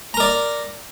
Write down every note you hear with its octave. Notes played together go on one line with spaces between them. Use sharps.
A#4 D5 A#5